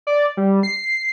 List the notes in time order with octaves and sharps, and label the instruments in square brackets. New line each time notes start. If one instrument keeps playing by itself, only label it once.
[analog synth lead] D5
G3
C7